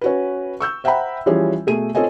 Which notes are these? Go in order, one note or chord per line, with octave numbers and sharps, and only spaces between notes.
C#4 F#4 B4
C#6 E6 G6
C5 E5 F#5 G5 A#5 B5
E3 F3 G3 C#4 G#4
B2 A3 G#4 D#7
C4 F4 A4 C#5 D#5 G#5